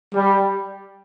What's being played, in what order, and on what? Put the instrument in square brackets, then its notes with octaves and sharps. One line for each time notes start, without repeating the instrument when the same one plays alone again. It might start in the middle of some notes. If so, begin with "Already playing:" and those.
[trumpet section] G3